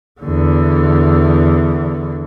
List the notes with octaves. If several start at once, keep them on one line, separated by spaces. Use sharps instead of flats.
E2 D3